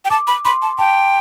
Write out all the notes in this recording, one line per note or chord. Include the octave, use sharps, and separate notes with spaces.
G5
A5 D6
B5
B5 C6
A5
G5 A5